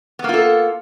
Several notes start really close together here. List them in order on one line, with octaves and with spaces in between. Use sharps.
B3 A#3 F4 A4